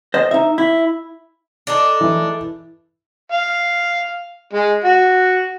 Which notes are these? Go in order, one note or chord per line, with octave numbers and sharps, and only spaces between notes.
C5 D#5
D#4 E5
E4
D4 D#4 A4
E3
F5
G#3
F#4